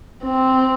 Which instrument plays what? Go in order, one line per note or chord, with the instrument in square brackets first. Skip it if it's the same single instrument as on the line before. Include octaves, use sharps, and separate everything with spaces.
[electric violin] C4